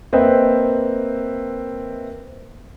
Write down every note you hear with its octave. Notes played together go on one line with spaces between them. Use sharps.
A#3 C4 B4 D#5 E5 G5